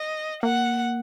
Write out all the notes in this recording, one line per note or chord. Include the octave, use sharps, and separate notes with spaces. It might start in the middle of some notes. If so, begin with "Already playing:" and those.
Already playing: D#5
A#3 F#5